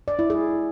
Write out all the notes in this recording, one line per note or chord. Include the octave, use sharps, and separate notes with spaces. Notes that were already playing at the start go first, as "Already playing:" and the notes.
D5
E4
G#4